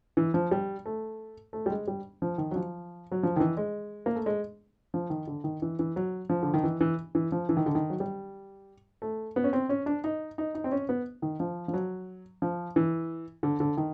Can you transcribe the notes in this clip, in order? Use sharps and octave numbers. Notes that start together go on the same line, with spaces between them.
E3
F3
G3
A3
A3
G3
G#3
G3
F3
D#3
F#3
F3
F#3
F3
D#3
E3
G#3
A#3
A3
G#3
F3
D#3
D3
D#3
E3
E3
F#3
F3
D3
D#3
E3
E3
E3
F3
E3
D#3
D3
D#3
F#3
G3
A3
B3
C#4
C4
C#4
D4
D#4
D#4
D#4
C4
C#4
B3
D#3
F3
F3
F#3
F3
E3
D3
D3
D#3